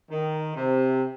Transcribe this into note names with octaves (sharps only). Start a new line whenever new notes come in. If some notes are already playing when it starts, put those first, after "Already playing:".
D#3
C3